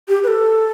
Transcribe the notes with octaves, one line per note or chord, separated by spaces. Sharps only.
G4
B4
A4